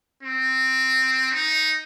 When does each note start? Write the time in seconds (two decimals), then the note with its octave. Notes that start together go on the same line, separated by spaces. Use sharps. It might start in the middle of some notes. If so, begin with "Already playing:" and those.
0.23 C4
1.32 D#4